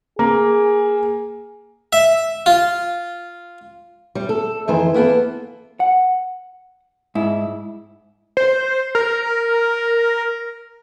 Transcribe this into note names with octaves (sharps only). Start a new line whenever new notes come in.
A#3 G#4
E5
F4
G3
A4
F2 D#3 E3 C5
A#3 B3 F4 A4
F#5
G#2 E4
C5
A#4